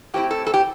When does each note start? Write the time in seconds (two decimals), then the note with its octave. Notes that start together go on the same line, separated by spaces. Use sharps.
0.14 A2 A3 C4 E4 G4
0.31 A4
0.47 A4
0.54 G4